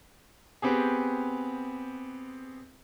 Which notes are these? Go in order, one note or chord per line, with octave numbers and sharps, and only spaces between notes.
B3 C4 G4 G#4